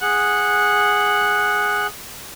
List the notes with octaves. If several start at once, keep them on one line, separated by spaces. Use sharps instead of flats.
G#4 F#5 F#6